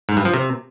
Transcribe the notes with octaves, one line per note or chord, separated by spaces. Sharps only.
G#2
G2
F3
C3